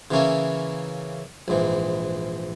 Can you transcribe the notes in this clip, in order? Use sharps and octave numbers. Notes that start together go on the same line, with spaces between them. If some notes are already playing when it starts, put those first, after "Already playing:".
C#3 E3 A#3 C#4 E4
A#1 G#2 E3